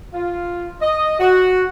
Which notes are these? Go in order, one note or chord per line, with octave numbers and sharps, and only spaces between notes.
F4
D#5
F#4